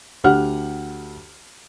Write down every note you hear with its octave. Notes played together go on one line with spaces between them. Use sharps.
D2 G4 F#5 F6